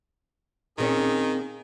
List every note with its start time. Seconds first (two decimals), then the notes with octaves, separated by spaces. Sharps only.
0.78 A#2 D#3 C4 C#4 G#4